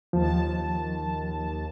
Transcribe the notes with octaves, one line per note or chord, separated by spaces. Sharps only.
D#2 F3 A5